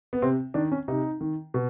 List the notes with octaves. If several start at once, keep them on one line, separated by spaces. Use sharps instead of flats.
B3
C3 C4
D#3 D4
C#4
C3 D#4
D#3
B2